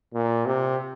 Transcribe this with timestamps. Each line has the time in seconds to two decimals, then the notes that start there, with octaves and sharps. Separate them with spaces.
0.14 A#2
0.46 C3